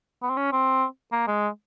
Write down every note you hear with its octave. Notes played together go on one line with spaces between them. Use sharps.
B3
C4
C#4
C4
A#3
G#3